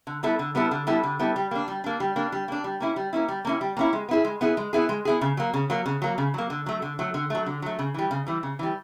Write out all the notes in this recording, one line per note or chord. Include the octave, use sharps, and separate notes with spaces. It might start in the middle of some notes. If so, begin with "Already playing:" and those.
D3
G3 B3 E4 A4
D3
G3 B3 E4 A4
D3
G3 B3 E4 A4
D3
G3 B3 E4 A4
G3
A#3 D4
G3
A#3 D4
G3
A#3 D4
G3
A#3 D4
G3
A#3 C#4 E4
G3
A#3 C#4 E4
G3
A#3 C#4 E4
G3
A#3 C#4 E4
G#3
B3
E4 G#4
G#3
B3 E4 G#4
G#3
B3 E4 G#4
G#3
B3 E4 G#4
C#3
F#3 A#3
C#3
F#3 A#3
C#3
F#3 A#3
C#3
F#3 A#3
D3
F#3 A3
D3
F#3 A3
D3
F#3 A3
D3
F#3 A3
C#3
E3 G3
C#3
E3 G3
C#3
E3 G3